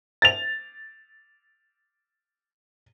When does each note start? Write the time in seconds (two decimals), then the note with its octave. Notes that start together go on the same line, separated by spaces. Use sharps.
0.22 A6 F7